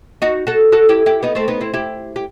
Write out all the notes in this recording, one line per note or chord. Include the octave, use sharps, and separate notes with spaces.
D#4 F#4
F#4 A4
F#4 A4
E4 G4
E4 G4
B3 D#4
A3 C4
B3 D#4
C4 E4
E4 G4
G4